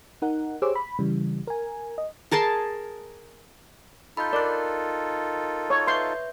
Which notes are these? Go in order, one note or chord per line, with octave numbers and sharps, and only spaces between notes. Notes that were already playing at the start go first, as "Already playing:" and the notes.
D#4 A#4 F#5
G4 G#4 C5 C#5 D6 E6
B5
C#3 E3 G3
A#4 G#5
D#5
G#4 A#4 A5 C6
D#4 F4 A4 B5 G6
A#4 D5 F#6
C#5
B4 E5 C6 G6